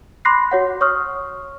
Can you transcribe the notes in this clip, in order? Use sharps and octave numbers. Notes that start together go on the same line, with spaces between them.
B5 C6 D6 F#6 A#6 C7
F#4 C#5 F#5
C#5 C#6 D#6 F6